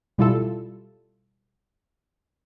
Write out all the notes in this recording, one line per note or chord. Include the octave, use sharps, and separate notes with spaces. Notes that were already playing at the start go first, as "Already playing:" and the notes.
B2 G3 E4 F4 A4